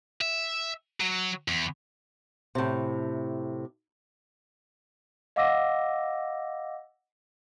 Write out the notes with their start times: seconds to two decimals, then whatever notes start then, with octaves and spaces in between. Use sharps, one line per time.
0.21 E5
1.00 F#3
1.48 E2
2.55 A2 C3
5.36 D#5 F5 F#5 D6 E6 A#6